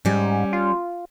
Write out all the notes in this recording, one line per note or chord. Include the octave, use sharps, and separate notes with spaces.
G#2 G3 C#4
F4